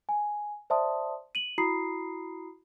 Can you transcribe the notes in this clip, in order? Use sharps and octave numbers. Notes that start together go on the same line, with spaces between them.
G#5
C5 D5 E5 A5 C6 D#6
D#7 F#7
E4 F#4 A#5 B5 D#6 C7